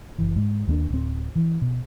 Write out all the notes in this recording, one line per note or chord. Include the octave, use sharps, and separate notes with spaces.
F#1 E3
G#2
D#2 A#3 D4
D1 C4
E3
B2